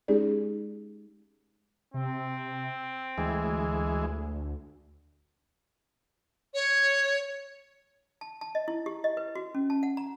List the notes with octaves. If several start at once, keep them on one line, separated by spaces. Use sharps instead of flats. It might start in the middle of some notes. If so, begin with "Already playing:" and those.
G#3 C#4 D#4 G4 G#4 D5
C3 C4
D2 E3 G#3
C#5
A5
A5
D#5
E4
G4
D#5
B4
F#4
C#4
A5
F#5
A#5